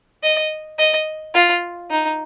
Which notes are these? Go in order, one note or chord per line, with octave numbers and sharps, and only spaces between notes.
D#5
D#5
F4
D#4